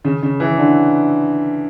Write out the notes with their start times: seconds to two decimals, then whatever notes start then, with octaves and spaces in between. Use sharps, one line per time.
0.04 C#3
0.23 C#3
0.40 E3
0.58 D3